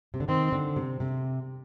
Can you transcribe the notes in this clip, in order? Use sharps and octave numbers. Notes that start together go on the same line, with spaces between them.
C3
D3
D#3 C4
D3
C3
C3